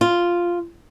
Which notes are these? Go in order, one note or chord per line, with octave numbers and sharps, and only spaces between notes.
F4